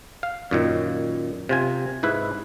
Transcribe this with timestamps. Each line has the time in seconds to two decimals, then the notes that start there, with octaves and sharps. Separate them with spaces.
0.23 F5
0.51 F#2 A#2 D#3
1.49 C3 F4 G#5
2.03 G#2 E4 B4